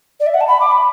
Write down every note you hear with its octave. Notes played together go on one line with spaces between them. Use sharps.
D5
E5
F#5
A5
B5
D6
B5